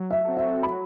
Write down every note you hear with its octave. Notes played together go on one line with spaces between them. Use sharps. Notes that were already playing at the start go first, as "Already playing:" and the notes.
Already playing: F#3
E5
C4 F#4 A4
E5
F#3 B5